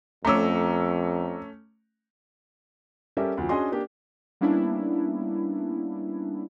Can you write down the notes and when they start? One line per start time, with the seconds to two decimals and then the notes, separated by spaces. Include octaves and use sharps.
0.25 F2 A3 C#4 A#5 D6 E6
3.17 G3 C#4 G4 A4 A#4 E5
3.37 D2 F3
3.49 C#4 D4 F#4 G#4 D#5 C6
3.72 A#3 D4 G4
4.41 G3 A#3 B3 C#4 D4 E4